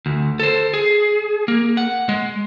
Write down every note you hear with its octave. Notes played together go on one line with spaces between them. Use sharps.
D2
A4 C5
G#4
A#3
F#5
G#3